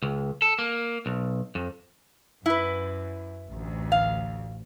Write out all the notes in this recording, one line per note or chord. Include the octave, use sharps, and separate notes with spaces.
C#2
A4
A#3
B1
F2
F#2 E4 B4
A1 D2
F5